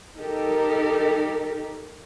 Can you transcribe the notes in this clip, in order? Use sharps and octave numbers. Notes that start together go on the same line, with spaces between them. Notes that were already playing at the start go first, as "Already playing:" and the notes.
D#4 G4 A4 A#4